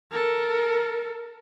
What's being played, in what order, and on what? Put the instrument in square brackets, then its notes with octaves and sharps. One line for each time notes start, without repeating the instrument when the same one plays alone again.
[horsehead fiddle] A4 A#4